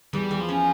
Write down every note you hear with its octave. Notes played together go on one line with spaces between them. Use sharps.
E2 G3
E2
F3
C#4